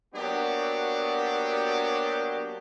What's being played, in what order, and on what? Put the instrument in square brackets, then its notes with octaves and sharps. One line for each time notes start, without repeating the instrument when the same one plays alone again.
[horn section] F#3 A#3 B3 D4 F#4 G4